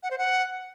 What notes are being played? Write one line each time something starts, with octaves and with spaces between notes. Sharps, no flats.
F#5
C5
F#5